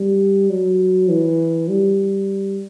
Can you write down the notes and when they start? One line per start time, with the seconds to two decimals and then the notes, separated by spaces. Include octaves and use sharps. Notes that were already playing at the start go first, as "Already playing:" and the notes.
Already playing: G3
0.50 F#3
1.09 E3
1.69 G3